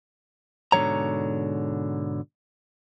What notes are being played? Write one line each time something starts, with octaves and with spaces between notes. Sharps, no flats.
G#2 B2 D3 F#3 C#5 A#5